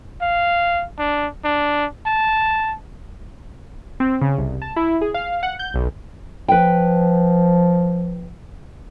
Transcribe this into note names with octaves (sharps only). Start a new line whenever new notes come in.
F5
D4
D4
A5
C4
C#3
C2
A5
E4
G#4
F5
F#5
G6
B1
F3 B4 G5